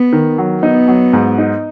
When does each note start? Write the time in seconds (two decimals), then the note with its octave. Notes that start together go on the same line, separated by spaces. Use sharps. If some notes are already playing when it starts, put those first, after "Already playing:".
Already playing: B3
0.13 D#3
0.38 F#3
0.63 B3 D#4
0.88 F#3
1.13 G#2
1.38 D#4